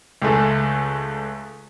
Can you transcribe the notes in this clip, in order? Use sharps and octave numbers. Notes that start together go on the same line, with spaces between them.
C#2 G#3 A3